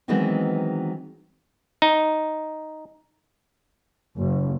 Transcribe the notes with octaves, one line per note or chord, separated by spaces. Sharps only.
D#3 E3 F#3 G#3 B3 C4
D#4
F#1